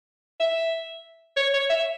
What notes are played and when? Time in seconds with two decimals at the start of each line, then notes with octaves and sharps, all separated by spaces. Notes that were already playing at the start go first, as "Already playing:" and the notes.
0.40 E5
1.37 C#5
1.54 C#5
1.70 E5